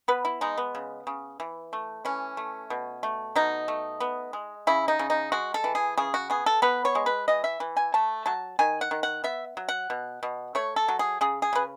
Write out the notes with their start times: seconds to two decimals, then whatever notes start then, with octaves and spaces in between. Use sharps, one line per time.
0.08 B3 B4
0.25 E4
0.41 G#3 D#4
0.57 B3
0.75 C#3
1.07 C#3
1.40 E3
1.73 A3
2.05 E3 C#4
2.37 A3
2.70 B2
3.03 A3
3.35 B2 D#4
3.68 A3
4.00 B3
4.33 G#3
4.67 C#3 E4
4.88 D#4
4.99 C#3
5.10 D#4
5.32 G#3 F#4
5.54 A4
5.64 E3
5.75 G#4
5.98 C#3 G#4
6.14 F#4
6.30 B3 G#4
6.46 A4
6.62 B3 B4
6.85 C#5
6.95 G#3
7.06 B4
7.28 E3 D#5
7.44 E5
7.60 E3
7.77 G#5
7.94 A3 A5
8.26 F#3 A5
8.59 D#3 G#5
8.81 F#5
8.91 D#3
9.03 F#5
9.24 B3 E5
9.57 F#3
9.69 F#5
9.90 B2
10.23 B2
10.55 A3 C#5
10.76 A4
10.88 F#3
10.99 G#4
11.21 C#3 G#4
11.42 G#4
11.53 C#3 B4